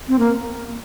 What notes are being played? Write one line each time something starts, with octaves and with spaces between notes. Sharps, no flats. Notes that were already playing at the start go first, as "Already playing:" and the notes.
C4
A#3